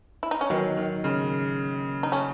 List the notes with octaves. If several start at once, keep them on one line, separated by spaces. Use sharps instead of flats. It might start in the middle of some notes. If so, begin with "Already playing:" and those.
E4
D#4
C#4
D#3 F#3 B3
D#3
C#3
D#4
A3 C#4